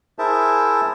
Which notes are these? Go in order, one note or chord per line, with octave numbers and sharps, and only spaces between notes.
E4 G#4 A#4 C5 E5 A5